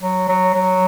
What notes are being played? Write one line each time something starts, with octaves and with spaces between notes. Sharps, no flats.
F#3
F#3
F#3